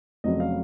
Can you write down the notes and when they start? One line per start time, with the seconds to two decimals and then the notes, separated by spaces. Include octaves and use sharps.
0.24 F1 F2 C#3 F#3 D#5
0.40 F5